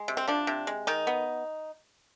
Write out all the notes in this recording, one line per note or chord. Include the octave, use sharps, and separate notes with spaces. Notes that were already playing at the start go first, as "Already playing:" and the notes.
Already playing: G#3
C3
C4
F3 D4
C3
G#3
D#3 D#4
B3